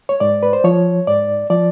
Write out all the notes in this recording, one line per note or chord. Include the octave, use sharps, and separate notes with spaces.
C#5
G#2 D5
B4
C5
F3 C#5
G#2 D5
F3 D5